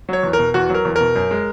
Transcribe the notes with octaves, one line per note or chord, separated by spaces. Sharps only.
F#3 C#5
E2
A#4
B2
E2 F#4
F#3 A#4
E2
B2 A#4
F#2
G#3